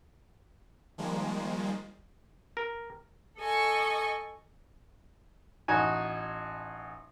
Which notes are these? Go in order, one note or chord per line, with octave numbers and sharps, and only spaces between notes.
D#3 F3 G3 G#3 A#3
A#4
A4 D#5 G#5 C#6
A1 D#4 F#4 G#5